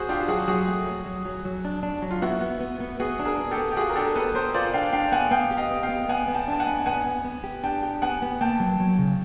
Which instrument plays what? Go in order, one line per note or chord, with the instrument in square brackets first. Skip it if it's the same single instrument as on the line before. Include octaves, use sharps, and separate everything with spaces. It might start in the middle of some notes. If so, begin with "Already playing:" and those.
Already playing: [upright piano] F#4 G#4 C5
[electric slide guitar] D4 [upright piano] F4 G4
[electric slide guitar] F#3 [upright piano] F#4 G#4
[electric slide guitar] F#3 [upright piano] F#4 G#4
[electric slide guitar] A3
F#3
F#3
F#3
F#3
D4
D4
F#3
[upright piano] F4
[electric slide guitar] B3 [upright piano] E4 F#4
[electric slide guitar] B3
B3
B3
[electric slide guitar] B3 [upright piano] F#4 G#4
[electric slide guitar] D4
[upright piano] G#4 A#4
[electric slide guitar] B3
[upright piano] G4 A4
[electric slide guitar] B3
[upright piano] G4
[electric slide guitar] F4 [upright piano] F#4 G#4
[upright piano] A#4
[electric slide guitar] D4 [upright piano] G4 A4
[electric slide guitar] B3 [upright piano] A4 B4
[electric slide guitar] B3 [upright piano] A#4 C5
[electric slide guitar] F4 [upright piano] C5 D5
[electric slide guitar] D4 [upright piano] F5 G5
[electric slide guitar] D4 [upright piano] F5 G5
[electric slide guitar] B3 [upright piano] F#5 G#5
[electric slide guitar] B3 [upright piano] F5 G5
[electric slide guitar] G4
[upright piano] D#5 F5
[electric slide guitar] B3
[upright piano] F5 G5
[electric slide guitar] B3
[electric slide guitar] B3 [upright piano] F#5 G#5
[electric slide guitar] B3
[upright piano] G5 A5
[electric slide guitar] D4 [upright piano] A5
[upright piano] F#5 G#5
[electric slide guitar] B3
[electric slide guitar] B3 [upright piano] F#5 G#5
[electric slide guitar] B3
B3
G4
[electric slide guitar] D4 [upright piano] G5 A5
[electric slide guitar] G4
[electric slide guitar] B3 [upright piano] F#5 G#5
[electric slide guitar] B3
[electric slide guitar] A#3 [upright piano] G5 A5
[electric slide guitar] F#3
F#3
C#3